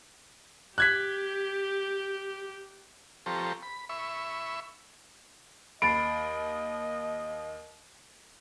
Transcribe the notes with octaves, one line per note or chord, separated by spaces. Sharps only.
G4 F#6 G#6 B6
F3 C4 G4 A4 A#5 C#6
B5
E5 B5 C#6
D#2 D#5 B5 A6 C7 D7